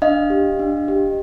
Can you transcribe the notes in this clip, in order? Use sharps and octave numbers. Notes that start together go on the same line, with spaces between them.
D4 D#5 F5
G4
D4
G4